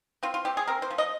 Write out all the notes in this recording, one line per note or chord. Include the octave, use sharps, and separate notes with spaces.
C4 F4
F4
C4 G4
G#4
C4 A#4
C5
F3
D#5